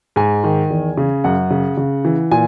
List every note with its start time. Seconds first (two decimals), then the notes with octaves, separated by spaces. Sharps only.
0.16 G#2 G#5
0.44 D#3
0.70 E2
0.98 C#3
1.24 F#2 F#5
1.51 C#3
1.77 C#3
2.05 E3
2.31 A#2 G#5